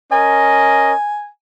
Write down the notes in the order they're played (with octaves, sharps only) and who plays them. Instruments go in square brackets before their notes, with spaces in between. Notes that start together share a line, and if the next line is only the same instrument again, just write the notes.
[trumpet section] C#4 A#4 D#5 [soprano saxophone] G#5